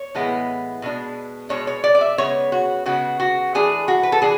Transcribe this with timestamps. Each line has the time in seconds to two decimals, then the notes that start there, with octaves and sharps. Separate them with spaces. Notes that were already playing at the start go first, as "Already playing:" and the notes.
Already playing: C#5
0.15 A2 E3 G#3 B3
0.82 B2 G#3 D4
1.50 B2 G#3 D4 C#5
1.67 C#5
1.84 D5
1.95 D5
2.01 E5
2.18 C#3 G#3 B3 C#5
2.52 F#4
2.86 C#3 G#3 B3 F#4
3.20 F#4
3.54 E3 A3 D4 G#4
3.88 F#4
4.03 B4
4.12 A4
4.22 E3 D4 G#4